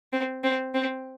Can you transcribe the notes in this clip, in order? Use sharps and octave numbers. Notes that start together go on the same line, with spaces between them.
C4
C4
C4